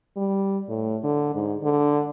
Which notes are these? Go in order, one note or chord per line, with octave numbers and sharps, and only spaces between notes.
G3
A2
D3
G#2
D3